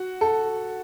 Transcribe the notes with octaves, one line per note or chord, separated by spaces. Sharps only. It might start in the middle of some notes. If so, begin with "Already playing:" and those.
Already playing: F#4
A4